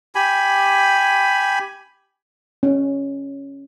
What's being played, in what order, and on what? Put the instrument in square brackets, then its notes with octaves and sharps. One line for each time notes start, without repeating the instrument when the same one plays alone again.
[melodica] G4 G#5 B5
[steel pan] C#4